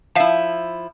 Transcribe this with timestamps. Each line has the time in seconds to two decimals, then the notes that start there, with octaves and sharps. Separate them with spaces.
0.15 F3 E4 E5 F5 A5